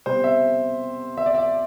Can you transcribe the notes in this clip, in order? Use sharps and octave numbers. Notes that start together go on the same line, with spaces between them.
C3 G3 B3 C5
E5
E5
D5
E5